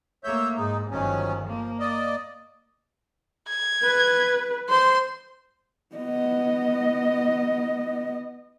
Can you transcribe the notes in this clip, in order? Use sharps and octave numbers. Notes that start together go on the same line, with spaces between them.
A3 A#3 C#5 E5 G6
G#2 D#4
G1 D#3 F3 F#3 C#4
F3 A#3
D5 D#5
G#6
B4
C5 C6
B3 D#5